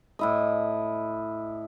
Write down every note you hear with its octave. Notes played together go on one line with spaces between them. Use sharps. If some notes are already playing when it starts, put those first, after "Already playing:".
A2 E4 D#5